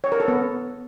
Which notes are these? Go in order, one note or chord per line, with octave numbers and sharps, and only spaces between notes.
C#5
A#4
A4
B3